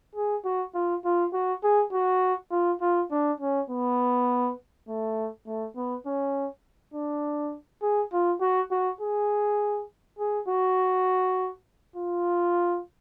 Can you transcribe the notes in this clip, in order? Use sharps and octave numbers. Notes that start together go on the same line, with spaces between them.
G#4
F#4
F4
F4
F#4
G#4
F#4
F4
F4
D4
C#4
B3
A3
A3
B3
C#4
D4
G#4
F4
F#4
F#4
G#4
G#4
F#4
F4